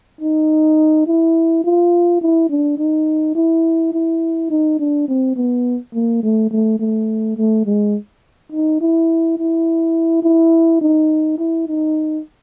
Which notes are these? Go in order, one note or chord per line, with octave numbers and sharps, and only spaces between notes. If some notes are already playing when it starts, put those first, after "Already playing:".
D#4
E4
F4
E4
D4
D#4
E4
E4
D#4
D4
C4
B3
A#3
A3
A3
A3
A3
G#3
D#4
E4
E4
E4
D#4
E4
D#4